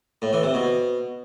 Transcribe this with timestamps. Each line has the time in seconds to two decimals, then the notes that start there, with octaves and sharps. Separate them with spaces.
0.22 A2
0.33 E3
0.43 C3
0.54 B2